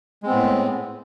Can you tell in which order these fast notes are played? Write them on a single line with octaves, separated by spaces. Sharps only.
G#3 C4 B3 A2